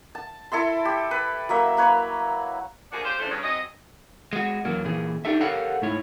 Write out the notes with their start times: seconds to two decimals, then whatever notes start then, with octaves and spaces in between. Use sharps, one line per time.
0.15 A5
0.52 E4 A4 E5 C6
0.85 G4
1.11 B4
1.49 F#3 A#3 E5
1.77 A#3 B4 C#5
2.92 F3 A#3 D4 F#4 G#4
3.04 F4 G4 C5
3.18 C#3 E3 F3 A3 D4 C5
3.31 G2 C#3 C#5
3.43 F#3 C4 G#4 D#5
4.33 G#3 F#4
4.65 E2 F#3 A#3
4.85 A#2 E3 G#4
5.25 D4 D#4 G4 A4 E5
5.40 G4 A4 A#4 C#5 F5 F#5
5.82 G#2 A3 E4 C#5